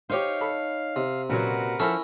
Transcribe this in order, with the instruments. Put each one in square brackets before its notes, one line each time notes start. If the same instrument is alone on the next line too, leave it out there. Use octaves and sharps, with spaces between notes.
[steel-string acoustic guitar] D#4 C#5 [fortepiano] G4 C5 [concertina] F5
[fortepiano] A4 B5
[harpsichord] C3
[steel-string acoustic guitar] A#2 F#4 [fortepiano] C#3 F#3 [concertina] A#4 B4 F#5
[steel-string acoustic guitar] F3 [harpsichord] C#4 E4 A#4 [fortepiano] A4 [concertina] E5 F#5